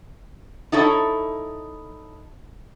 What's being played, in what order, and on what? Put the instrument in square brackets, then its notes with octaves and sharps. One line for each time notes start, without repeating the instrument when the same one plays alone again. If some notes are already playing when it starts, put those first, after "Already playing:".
[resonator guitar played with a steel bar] D#4 E4 A4 C#5